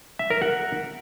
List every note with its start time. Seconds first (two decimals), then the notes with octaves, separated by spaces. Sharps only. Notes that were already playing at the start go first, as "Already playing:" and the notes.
0.19 E5
0.31 A#4
0.42 F#5